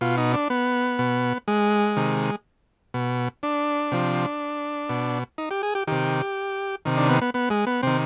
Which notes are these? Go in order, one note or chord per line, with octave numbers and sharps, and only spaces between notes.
B2 F4
D#4
D4
B3
B2
G#3
C3 D#3
B2
D4
C3 F3
B2
D#4
G4
G#4
G4
C3 D#3 G4
C3 D#3
D4
B3
B3
B3
G#3
B3
C3 D#3 C4